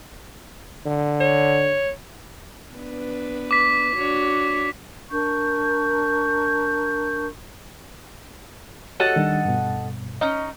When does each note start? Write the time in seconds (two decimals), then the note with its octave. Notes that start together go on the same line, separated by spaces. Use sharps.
0.86 D3
1.20 C#5
2.74 B3 D4 B4
3.51 D6 B6
3.96 D4 F#4 C#5
5.11 D4 A#4 C#6 G6
9.00 F#4 G4 A4 C#5 D#5 F#5
9.16 D#3 G3 D4
9.45 G2 B2
10.21 C#4 D#4 D#5